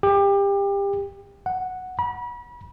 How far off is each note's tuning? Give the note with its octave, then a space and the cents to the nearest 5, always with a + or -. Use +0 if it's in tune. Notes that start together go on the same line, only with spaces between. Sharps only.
G4 +25
F#5 +0
B5 -35